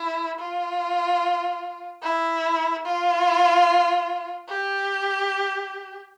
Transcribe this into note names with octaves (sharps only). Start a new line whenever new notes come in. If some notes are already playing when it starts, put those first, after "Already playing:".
Already playing: E4
F4
E4
F4
G4